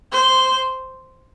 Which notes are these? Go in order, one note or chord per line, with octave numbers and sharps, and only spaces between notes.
C5